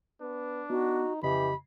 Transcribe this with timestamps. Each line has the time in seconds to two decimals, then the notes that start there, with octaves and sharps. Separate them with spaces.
0.21 B3 D4
0.70 B3 D#4 F#4
1.23 F2 C#3 E3 G4 D#5 B5